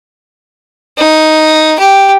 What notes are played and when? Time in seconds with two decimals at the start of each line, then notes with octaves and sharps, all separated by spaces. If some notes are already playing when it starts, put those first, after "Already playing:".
0.98 D#4
1.79 G4